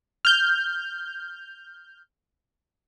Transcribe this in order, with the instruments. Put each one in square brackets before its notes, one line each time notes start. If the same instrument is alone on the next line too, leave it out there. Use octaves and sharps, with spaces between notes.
[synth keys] F6 G6